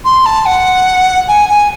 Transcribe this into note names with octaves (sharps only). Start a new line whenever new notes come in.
C6
A5
F#5
G#5
G#5